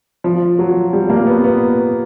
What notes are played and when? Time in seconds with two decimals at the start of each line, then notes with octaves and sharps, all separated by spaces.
0.24 F3
0.59 F#3
0.93 G3
1.09 A#3
1.27 B3
1.44 B3